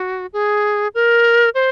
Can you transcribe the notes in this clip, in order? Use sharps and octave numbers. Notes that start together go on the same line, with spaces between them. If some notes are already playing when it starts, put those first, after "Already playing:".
Already playing: F#4
G#4
A#4
C5